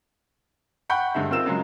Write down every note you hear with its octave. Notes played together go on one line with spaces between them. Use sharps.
F#5 G5 B5 C#6 G6
G2 D3 G#3 E5
C4 D#4 F4 A#4 E6 E7
C#3 F#3 G#3